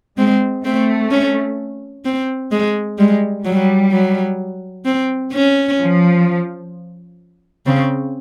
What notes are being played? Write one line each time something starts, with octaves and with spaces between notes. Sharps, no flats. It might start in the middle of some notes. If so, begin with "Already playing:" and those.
G#3 C4
A3 C4
C#4
C4
G#3
G3 G#3
F#3 G3
F#3
C4
C#4
F3
C#3 C4